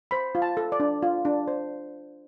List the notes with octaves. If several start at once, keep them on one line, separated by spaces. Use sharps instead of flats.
C5 B5
F4
A5
A4
D5
D4
F4
D4
C5